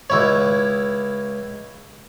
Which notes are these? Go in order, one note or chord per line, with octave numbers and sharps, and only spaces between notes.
C#2 E4 C#5